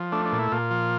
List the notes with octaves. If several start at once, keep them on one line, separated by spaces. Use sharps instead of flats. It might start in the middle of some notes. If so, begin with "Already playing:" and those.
Already playing: F3
A3 D4
D4
A#2
E4
A#2 F4
F3